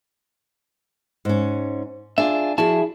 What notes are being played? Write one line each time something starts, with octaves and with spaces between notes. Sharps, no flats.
G#2 C#4
D4 F4 G#4 E5
F3 E4 F#4 G#4 A5